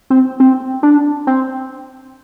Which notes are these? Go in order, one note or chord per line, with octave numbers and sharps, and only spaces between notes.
C4
C4
D4
C4